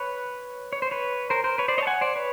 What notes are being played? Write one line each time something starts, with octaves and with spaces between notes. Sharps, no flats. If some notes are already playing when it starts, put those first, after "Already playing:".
Already playing: B4 C#5
C#5
C5
B4 C#5
A#4 C5
A#4 C5
B4 C#5
C5 D5
C#5 D#5
A5
F#5 G#5
C5 D5
B4 C#5